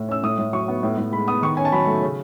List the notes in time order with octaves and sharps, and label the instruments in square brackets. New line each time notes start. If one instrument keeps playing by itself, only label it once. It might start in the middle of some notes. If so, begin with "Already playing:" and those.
Already playing: [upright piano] A2
C#4 E6
A2 D#6
A2
F#3 C#6
B3
A2
A2
G#3 B5
B3 D#6
D#3 C#6
C#4 G#5
A5
F#3 B5
A3
C#3